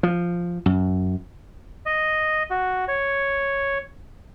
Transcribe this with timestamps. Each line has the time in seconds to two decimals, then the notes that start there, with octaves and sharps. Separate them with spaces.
0.03 F3
0.66 F#2
1.86 D#5
2.50 F#4
2.88 C#5